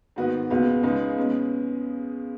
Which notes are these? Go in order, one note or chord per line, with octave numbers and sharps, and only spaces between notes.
G#2 D#3 B3 F#4 B4
C#2 B2 B3 F#4 B4
C#2 C#3 G#3 D#4 B4
B2 G#3 C#4 B4